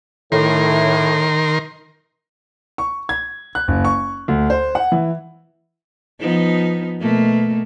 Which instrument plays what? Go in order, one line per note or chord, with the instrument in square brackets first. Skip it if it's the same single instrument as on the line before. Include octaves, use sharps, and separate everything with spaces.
[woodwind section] A2 [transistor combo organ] D#3 A#4 C6
[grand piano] C#6
G#6
F#6
F#1
C#6
D2
C5
F#5
E3
[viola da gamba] F3 B3 D#4
B2 A3 A#3